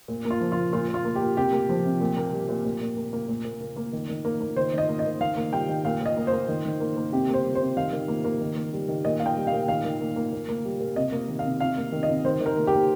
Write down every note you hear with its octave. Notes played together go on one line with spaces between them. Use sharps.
A#2
A#3
F4
F3
A#2 F4
A#2 F4
A#2
F4
A#3
G4
A#3
C3 G4
A#3
F3
C3
A#2
A#3
G3
A#2
A#2
A#2
A#3
A#3
A#2
A#2
A#3
A#3
D#3
D#3
A#3
A#3
D#3 C5
D#3 D#5
A#3
D#5
A#3
D#3 F5
A#3
G3 G5
D#3
A#2 F5
A#2 D#5
A#3
C5
A#3
D#3
D#3
A#3
A#3
C3 G4
A#3
C5
G3
C5
C3
D#3 F5
D#3
A#3
A#3
D#3
A#3
G3
D#3
A#2 D#5
A#3 F5
G5
G3
F5
A#2
D#3 F5
D#3
A#3
A#3
A#2
A#3
G3
A#2
C3 D#5
A#3
D#3
F5
C3
C3 F5
A#3
D#3
D#5
C3
D#3 C5
D#3
A#4
A#3
G4
A#3